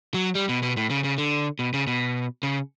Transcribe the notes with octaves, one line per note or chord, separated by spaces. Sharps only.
F#3
G3
B2
B2
A2
C#3
C#3
D3
B2
C#3
B2
C#3